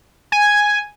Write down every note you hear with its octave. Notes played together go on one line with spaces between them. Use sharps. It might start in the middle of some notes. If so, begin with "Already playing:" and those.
G#5